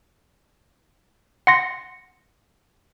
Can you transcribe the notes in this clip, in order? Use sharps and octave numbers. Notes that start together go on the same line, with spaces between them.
F#5 C6 A#6 C#7